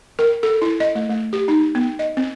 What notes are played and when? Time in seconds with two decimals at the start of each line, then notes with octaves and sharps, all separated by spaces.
0.19 A#4
0.43 A4
0.62 E4
0.80 D#5
0.95 A3
1.09 A3
1.33 G4
1.48 D#4
1.75 B3
1.99 D#5
2.17 C4